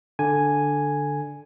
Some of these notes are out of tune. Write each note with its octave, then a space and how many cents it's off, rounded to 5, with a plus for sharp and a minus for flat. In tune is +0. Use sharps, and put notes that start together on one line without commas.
D3 +0 G#5 +0